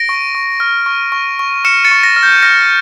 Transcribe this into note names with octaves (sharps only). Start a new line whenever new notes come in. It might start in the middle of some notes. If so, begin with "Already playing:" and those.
Already playing: A#6 D7
C#6
C#6
F6
C#6
C#6
C#6
F6 C#7 E7
A6 C#7
C#6
A#6
F6
G6
F6 A#6